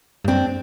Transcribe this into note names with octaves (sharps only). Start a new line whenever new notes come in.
G2
F#2 C4 D4